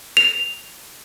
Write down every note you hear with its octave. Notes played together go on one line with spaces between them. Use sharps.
F7